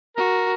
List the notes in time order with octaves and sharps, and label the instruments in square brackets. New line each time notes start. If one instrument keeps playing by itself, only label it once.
[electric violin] F#4 [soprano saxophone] A#4